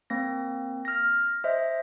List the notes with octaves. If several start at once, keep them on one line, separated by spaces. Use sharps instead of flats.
A#3 C4 A#6
F6 A#6
C5 D#5 E5